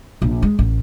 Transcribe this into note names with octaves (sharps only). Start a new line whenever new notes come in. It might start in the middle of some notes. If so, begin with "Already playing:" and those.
A#1
G#3
A1